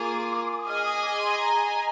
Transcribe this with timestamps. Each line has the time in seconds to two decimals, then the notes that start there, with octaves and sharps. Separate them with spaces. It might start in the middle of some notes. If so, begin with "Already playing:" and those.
Already playing: A#3 F4 G#4 D6
0.58 D#6
0.67 G#4 D#5 G#5 F6
0.85 D#6
1.02 D6
1.19 C6
1.37 A#5